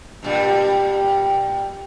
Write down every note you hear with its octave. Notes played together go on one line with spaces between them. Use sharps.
G2 A#2 G3